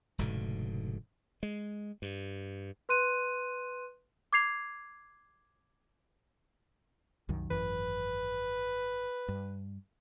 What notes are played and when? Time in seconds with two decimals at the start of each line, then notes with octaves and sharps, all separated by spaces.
0.18 F1 G#2 B2 D3
1.43 G#3
2.02 G2
2.89 B4 C6 F#6 D#7
4.33 D6 G#6 C7 F7
7.29 C2 F#2 D#3
7.50 G#1 F#2 E3 B4
9.28 G2